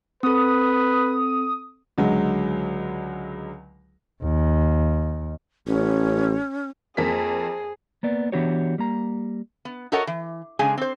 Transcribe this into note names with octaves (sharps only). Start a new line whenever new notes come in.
C4 A4 B4 D#6
C#2 D3 F#3 G#3
D#2
A1 C#4
F2 A#3 G#4 B6
A#3 B3 D5
E3 B3 D4 F#4 G4 C#5
G3 A#3 A#5
B3
F#4 A4 A#4 C#5 D#5 F#5
E3
C#3 G#3 D4 G#4 G#5
C4 C5